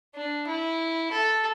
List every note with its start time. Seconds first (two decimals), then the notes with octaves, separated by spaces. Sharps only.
0.15 D4
0.47 E4
1.11 A4